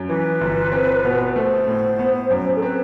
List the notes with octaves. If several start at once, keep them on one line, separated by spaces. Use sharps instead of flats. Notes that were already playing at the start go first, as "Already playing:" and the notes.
Already playing: F#2
E3 B4
G1
C4
B2
A3 C5
A2
B3
F#2
A4
C4 B4